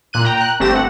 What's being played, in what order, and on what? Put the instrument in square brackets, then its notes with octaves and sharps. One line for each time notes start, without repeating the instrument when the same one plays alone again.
[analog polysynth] A#2 F#6 D#7
G5 A#5
F#6
G1 A3 C4 G4 A#6 E7
F#5